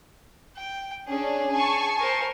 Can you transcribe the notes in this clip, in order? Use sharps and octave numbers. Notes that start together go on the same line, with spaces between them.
G5
C#4 D4 G#4
G#5 A5 C#6
A#4 C5